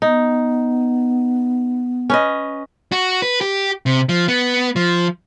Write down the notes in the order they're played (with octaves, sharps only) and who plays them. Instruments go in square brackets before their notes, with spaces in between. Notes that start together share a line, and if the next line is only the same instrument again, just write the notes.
[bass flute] B3 [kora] D#4
[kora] C#4 B4 D#5
[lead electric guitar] F#4
B4
G4
C3
F3
B3
F3